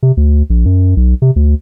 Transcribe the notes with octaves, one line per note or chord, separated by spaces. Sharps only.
C3
D2
A#1
F#2
B1
C3
D2